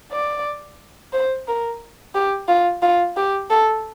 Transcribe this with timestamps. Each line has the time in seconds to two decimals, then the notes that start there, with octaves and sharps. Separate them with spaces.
0.12 D5
1.13 C5
1.48 A#4
2.15 G4
2.48 F4
2.82 F4
3.17 G4
3.50 A4